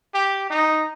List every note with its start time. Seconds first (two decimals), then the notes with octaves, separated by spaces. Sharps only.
0.14 G4
0.50 D#4